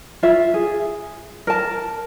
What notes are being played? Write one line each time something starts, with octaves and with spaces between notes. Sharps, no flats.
F4 E5
G#4
A#4 A5